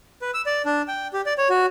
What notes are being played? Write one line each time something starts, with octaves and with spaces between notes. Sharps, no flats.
B4
E6
D5
D4
G5
G4
D5
C#5
F#4